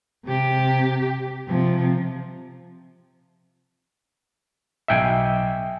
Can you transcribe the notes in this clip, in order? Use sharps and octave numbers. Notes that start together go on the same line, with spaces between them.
C3 G4
C3 F3
B1 E5 G5 G#5 C7